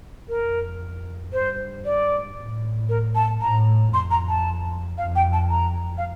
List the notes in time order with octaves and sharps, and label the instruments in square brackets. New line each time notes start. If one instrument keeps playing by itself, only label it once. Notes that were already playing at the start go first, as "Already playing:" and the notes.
[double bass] F2 [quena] A#4
[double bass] G2 [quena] C5
[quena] D5
[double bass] A2
[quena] A#4
A5
[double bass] A2 [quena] A#5
[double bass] F2 [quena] C6
[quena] A#5
A5
[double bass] F2 [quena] F5
[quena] G5
A5
A#5
F5